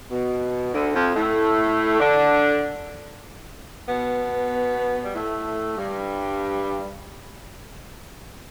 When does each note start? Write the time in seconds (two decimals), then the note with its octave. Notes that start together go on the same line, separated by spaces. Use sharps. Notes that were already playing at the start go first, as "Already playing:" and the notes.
0.11 B2
0.73 D2 D3
0.94 F2 F3
1.16 A2 A3
2.00 D3 D4
3.89 B2 B3
5.03 G3
5.14 A2 A3
5.77 G2 G3